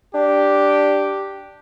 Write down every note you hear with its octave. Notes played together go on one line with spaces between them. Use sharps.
D4 G4